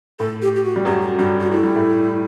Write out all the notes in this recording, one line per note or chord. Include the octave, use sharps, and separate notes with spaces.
A2 A4
G4
G4
F#4
G3
F#2 F#3 G4
F#4
G2 G3 F#4
F#4
A3 E4
G3
A2 A3